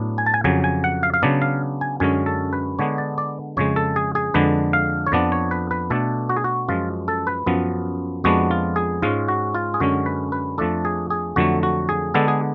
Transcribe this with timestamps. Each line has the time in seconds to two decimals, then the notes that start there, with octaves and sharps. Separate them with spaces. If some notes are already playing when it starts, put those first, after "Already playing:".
Already playing: A2 F#3 B3 D4
0.18 G#5
0.26 A5
0.34 G#5
0.44 F2 C#3 F#3 G#5
0.64 G#5
0.84 F#5
1.03 F5
1.14 F5
1.22 C#3 F#3 B3 D4 D5
1.42 F5
1.81 G#5
2.00 F#2 D3 G#3 C#4 G#5
2.26 A4
2.53 B4
2.79 D3 G#3 B3 D4 C#5
2.98 D5
3.18 D5
3.57 F2 C#3 G#3 C#5
3.76 A4
3.96 G#4
4.15 G#4
4.34 F2 D3 G#3 D4 B4
4.73 F5
5.07 C#5
5.12 F2 F3 B3 D4 D5
5.32 C#5
5.51 B4
5.71 B4
5.90 B2 A3 D4 A4
6.29 F#4
6.37 G#4
6.44 F#4
6.68 F#2 F3 G#3 F4
7.08 A4
7.27 B4
7.46 F#2 F3 B3
8.24 F2 F3 G#3 B3 D4 F#4
8.51 F4
8.76 G#4
9.02 G#2 G#3 C#4 F4
9.28 F#4
9.55 F4
9.74 G#4
9.80 F#2 D3 G#3 C#4 F#4
10.06 B4
10.32 B4
10.58 F2 F3 A3 D4 A4
10.85 G#4
11.10 G#4
11.36 F2 D3 F#3 A3 F#4
11.63 F#4
11.89 G#4
12.14 D3 G#3 B3 D4 A4
12.28 G#4